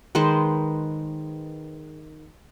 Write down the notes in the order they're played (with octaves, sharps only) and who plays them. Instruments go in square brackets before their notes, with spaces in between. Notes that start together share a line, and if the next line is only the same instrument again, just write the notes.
[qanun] D#3 G#3 B4 C5